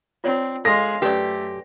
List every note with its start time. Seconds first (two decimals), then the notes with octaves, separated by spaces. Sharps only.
0.24 C4 F4 C#5 D5
0.65 G#3 A4 F5 C6 A#6
1.02 F#2 A3 G4 B4 D5